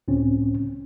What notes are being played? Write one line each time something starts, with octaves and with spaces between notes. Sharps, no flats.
C#2 A2 C4 C#4